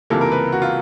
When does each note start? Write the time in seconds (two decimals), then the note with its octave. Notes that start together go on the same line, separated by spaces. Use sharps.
0.10 C#2 C3 E3 G3 A#3 A4
0.21 A#4
0.32 B4
0.52 F#4
0.62 F4